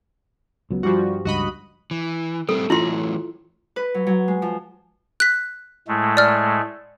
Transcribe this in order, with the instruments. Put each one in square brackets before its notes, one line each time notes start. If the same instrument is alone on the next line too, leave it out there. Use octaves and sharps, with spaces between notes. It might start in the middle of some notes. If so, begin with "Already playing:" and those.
[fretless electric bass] C#2 F#3 B3
[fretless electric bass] G2 [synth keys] F3 G3 F#4
[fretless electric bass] C#2 G2 F3 [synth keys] F#4 D#5 B5
[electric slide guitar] E3
[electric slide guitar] G3 A3 C4 [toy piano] A4
[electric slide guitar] E3 F#3 A3 [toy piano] E4 F4 C6
[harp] B4
F#3
F#3
G#3
F3
[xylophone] F#6 B6
[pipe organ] A2 G#3 A3
[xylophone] D5 F6